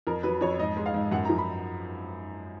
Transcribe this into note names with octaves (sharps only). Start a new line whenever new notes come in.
F2 A#4
F#3 B4
F2 C#5
G#2 D#5
G#3
F5
G#2
F#2 F#5
A#5
F3
B5